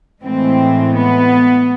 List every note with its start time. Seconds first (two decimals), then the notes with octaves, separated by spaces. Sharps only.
0.23 A2 E3 G#3 C4
0.94 B3